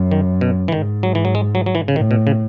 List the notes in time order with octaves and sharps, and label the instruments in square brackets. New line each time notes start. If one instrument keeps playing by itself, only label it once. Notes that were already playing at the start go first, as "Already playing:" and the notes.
Already playing: [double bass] F#2
[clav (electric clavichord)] D#3
B2
E3
[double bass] G#2 [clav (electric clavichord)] D#3
[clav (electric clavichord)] F#3
E3
F#3
G#3
F#3
F#3
E3
C#3
[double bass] A2 [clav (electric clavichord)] D#3
[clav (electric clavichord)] B2
C#3